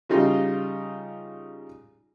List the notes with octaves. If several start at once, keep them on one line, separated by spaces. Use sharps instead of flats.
C#3 G3 D#4 F4